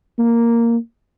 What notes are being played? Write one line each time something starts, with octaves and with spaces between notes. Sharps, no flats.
A#3